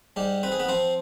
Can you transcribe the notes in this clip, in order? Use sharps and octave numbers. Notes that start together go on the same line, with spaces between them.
G#2 G3 G4
C4 B4
G#4
B3 B4
F3 C4 C5